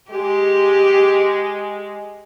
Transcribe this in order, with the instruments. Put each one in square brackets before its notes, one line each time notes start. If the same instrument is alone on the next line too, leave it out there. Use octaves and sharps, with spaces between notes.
[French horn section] G#3 [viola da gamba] G4